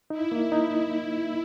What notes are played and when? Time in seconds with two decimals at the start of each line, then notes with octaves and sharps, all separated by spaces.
0.10 D#4 E4
0.32 A#3
0.52 D#4